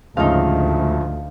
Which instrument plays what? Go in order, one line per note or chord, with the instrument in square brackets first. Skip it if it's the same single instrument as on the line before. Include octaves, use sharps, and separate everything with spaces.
[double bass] D2 [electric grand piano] G#2 C#3 F3 [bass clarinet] A3 [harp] D#4 F5